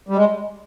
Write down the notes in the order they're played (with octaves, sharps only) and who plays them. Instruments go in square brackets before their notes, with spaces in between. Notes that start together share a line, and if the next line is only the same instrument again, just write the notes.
[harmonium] G3
G#3